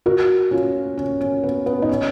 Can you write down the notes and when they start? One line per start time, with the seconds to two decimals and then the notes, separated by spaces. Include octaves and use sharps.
0.06 F#4 A#4
0.51 C#4 F4
0.98 C#4
1.21 C#4
1.43 B3
1.66 B3
1.82 D#4
1.89 C#4